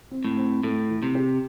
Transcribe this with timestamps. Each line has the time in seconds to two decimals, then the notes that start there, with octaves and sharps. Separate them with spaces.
0.11 C4
0.24 A2
0.37 C4
0.63 A2 A3
0.89 E3
1.02 C3
1.15 G4